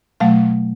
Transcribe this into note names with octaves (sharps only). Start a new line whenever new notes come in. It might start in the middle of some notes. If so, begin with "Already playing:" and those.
B2 F#3 A3 F5